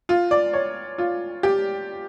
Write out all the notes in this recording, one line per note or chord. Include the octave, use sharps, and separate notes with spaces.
F4
D5
C#5
F4
G4